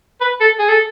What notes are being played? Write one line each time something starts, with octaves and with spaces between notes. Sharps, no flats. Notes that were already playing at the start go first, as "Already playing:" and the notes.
B4
A4
G#4
A4